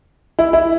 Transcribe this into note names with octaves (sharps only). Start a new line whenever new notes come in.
E4
E4